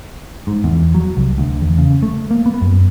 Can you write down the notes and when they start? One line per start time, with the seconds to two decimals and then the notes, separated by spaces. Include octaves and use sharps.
0.47 G#2
0.64 E2
0.94 F#3
1.17 C2
1.38 D2
1.61 E2
1.78 C#3
2.02 A3
2.31 A#3
2.46 B3
2.61 F#2